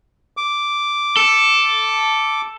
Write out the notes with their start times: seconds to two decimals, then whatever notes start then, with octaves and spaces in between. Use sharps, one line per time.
0.37 D6
1.17 A4